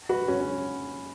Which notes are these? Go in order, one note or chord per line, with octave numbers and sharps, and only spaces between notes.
F#4 B4
C#4 F#4
C#4